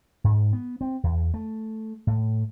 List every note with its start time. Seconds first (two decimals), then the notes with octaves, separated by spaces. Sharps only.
0.24 G#2
0.53 B3
0.81 C4
1.04 E2
1.34 A3
2.07 A2